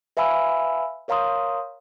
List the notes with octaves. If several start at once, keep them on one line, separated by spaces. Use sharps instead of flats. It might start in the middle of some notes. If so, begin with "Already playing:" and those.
B4 E5 F5 G#5 B5 E6
A#4 C#5 F5 A#5 C6 D#6